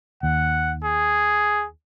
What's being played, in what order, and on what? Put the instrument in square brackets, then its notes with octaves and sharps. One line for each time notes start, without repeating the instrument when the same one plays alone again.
[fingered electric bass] D#2 [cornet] F#5
[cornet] G#4